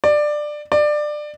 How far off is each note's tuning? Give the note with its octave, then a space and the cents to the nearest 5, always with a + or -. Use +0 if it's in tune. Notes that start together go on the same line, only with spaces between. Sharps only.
D5 +15
D5 +20